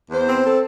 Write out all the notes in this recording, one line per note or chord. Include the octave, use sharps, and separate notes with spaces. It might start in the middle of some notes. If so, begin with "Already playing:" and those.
E2 C5
C4
A4